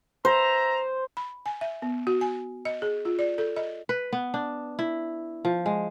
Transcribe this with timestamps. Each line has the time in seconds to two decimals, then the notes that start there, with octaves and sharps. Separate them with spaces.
0.25 C5 E5 A#5
1.17 B5
1.46 G#5
1.61 E5
1.82 B3
2.07 F#4
2.21 G#5
2.65 D#5
2.82 G#4
3.05 F4
3.19 D5
3.38 A4
3.56 D#5
3.89 B4
4.13 B3
4.34 D4
4.79 E4
5.45 F3
5.66 G#3